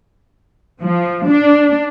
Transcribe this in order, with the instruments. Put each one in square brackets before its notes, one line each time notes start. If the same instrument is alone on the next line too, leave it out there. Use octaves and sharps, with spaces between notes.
[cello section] F3
D4